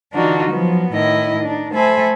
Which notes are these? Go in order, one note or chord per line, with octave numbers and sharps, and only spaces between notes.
D3 E3 D4 D#4 F4 F#4
F3 F#3 B3
A2 D#3 E4 D#5
D4 D#4
A3 A4 C5 E5 G#5 B5